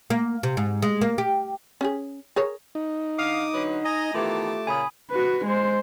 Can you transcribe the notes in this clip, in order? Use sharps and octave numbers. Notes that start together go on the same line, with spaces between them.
A#3
C3
G#2
G#3
A#3
G4
C#4 G4 G#4
G#4 A#4 C#5
D#4
D3 F5 D6 D#6
D3 F#3 B4
D#5 G#5 A#5
D#3 E3 A3 B3 F4 G4 A5 D6
A#2 C#3 G#5 B5 D#6
F#4 B4
G#3 C5